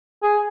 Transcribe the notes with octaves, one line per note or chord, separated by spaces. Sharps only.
G#4